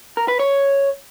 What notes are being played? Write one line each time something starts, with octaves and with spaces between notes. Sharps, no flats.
A#4
B4
C#5